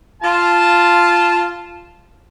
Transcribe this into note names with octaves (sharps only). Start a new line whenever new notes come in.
F4 A5